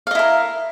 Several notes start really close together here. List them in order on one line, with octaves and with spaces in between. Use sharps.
F5 D#5 E4 A#4